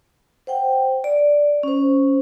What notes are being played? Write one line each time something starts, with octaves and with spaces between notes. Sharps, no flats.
C5 F#5 G5
D5
C#4 C5